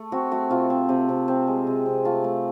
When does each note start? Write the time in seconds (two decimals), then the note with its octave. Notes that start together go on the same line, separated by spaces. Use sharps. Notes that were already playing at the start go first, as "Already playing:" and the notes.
Already playing: A3
0.12 C4 F#4
0.31 A3 F#4
0.50 C3 F4
0.70 C4
0.89 C3
1.09 C3
1.28 C4
1.47 G#3
1.67 C3
1.86 C3
2.05 A3 F4
2.24 A3